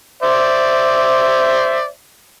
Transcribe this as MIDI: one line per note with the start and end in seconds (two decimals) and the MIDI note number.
0.23 1.87 72
0.23 1.87 74
0.23 1.87 76